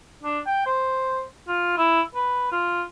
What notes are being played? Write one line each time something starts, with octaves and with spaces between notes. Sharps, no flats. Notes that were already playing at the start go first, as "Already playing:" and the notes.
D4
G5
C5
F4
E4
B4
F4